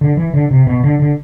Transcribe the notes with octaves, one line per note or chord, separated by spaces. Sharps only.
D3
E3
D3
C3
B2
D3
D3